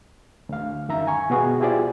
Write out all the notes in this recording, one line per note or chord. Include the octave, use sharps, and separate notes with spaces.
D2 F5
F#2 D#3 E5 A#5
G#5 C#6
B2 B3 F#4 G#4
E4 F4 G4 G#4 C5 D5